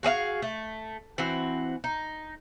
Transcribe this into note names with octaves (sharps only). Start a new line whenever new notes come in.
F#4 G#4 D#5 F5
A3
E3 C4 F#4
D#4